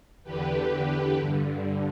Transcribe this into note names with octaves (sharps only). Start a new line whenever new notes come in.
E2 D3 G4 B4
G2 D3